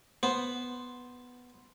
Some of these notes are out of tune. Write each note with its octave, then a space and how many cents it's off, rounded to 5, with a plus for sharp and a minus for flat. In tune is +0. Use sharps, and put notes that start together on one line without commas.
B3 +0 C5 +0